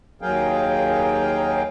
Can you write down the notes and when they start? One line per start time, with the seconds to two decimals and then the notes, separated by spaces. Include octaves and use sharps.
0.22 D#2 F#3 G#4 A#4 F5 G5